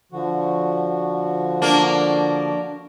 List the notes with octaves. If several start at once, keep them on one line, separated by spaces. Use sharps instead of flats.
D3 F3 F#4
A#3 D4